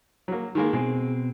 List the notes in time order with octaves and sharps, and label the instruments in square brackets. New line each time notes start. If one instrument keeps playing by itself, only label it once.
[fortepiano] F#3 A#3
D#3 G#3 A#3
[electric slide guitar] B2 C4 [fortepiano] G#3